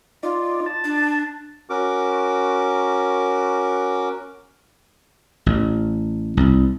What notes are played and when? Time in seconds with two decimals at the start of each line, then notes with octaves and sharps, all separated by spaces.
0.23 D#4 F4 D5
0.66 A5
0.84 D4
1.70 C#4 F#4 A#4 D6
5.46 A1
6.37 C2